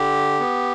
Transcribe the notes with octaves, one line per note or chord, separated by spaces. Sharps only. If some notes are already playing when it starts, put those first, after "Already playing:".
Already playing: D3 G4
B3